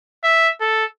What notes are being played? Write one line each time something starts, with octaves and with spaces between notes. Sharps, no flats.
E5
A4